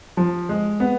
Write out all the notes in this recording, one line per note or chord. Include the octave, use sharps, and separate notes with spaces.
F3
G#3
B3